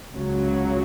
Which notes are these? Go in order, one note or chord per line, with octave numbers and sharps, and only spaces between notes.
C#2 C#3 F#3